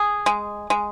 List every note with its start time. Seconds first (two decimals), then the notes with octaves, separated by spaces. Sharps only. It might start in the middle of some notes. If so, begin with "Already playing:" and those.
Already playing: G#4
0.26 G#3
0.70 G#3